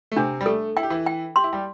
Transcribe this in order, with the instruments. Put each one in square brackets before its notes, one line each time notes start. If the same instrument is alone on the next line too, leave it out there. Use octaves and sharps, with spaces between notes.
[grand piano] A3
[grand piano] C3 C4 [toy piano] D4
[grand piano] G3
[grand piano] A3 [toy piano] A4
[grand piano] E4 [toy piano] G5
[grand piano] G4
E3 E4
[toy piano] G5
[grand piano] G4 [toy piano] C6
[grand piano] E4
G3 G4